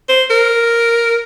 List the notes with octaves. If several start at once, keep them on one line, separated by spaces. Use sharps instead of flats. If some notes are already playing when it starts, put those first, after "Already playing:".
C5
A#4